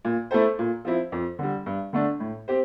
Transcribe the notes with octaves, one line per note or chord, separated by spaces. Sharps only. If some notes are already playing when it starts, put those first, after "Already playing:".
A#2
A3 E4 A4 C5
A#2
F3 C4 E4
F2
D3 G3
G2
D3 A3 D4
A2
C4 G4 C5